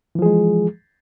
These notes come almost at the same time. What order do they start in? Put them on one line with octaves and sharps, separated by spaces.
E3 F3 G#4 G#3